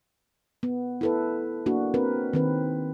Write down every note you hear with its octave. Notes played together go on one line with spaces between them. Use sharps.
B3
E4 A4 B4
A#3 D4 F#4
C4 A#4 B4
D#3 C4 B4